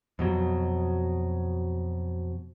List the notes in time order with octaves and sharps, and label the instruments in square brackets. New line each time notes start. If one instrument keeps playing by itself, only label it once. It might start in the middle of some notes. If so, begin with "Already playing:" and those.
[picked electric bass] F2 B2 F#3